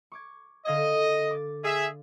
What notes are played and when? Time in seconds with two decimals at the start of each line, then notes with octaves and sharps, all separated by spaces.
0.12 C#6 D6 G#6
0.66 D3 D#5 F5 G#6
1.31 D6 A6
1.63 G#4 E5